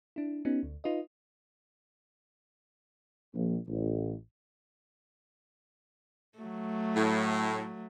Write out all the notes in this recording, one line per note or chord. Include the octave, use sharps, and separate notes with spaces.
D4 E4
B3 C#4 D#4 F#4
D2
D#4 F4 B4 D#5
A#1
A1
F#3 A3
A2